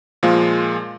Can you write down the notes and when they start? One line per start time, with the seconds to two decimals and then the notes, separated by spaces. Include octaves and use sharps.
0.23 A#2 F3 G#3 A#3 F4